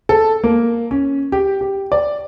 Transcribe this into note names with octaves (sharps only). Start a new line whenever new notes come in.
A4
A#3
C#4
G4
G4
D5